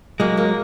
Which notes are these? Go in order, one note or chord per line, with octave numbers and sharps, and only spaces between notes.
F#3 G#3 A#3
A#3